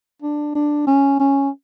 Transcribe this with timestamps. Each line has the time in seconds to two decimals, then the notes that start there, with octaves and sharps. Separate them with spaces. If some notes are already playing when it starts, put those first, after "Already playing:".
0.22 D4
0.55 D4
0.87 C#4
1.20 C#4